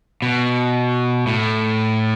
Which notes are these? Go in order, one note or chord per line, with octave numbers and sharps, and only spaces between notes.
B2
A2